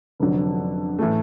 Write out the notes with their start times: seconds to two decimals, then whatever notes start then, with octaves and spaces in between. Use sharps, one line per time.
0.20 F1 F2 D3 F#3
0.99 A2 E3 A3